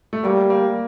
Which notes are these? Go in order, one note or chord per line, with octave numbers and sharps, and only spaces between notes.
A3
G3 A#3
A#3